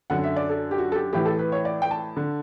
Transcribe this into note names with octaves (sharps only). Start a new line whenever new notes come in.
F#2 D3 F#5
E5
D5
A4
G4
F#4
A4
G4
A2 E3 G4
A4
B4
C#5
D5
G5
A5
D3